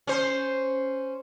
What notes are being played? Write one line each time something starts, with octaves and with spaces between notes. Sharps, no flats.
C#4 C5